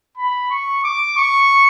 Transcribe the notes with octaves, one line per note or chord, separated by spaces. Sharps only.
B5
C#6
D6
C#6